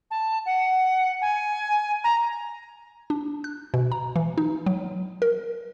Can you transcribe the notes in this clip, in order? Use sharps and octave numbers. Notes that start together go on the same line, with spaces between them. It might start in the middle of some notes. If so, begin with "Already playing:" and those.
A5
F#5
G#5
A#5
D4
F#6
B2
A#5
E3
D#4
F#3
A#4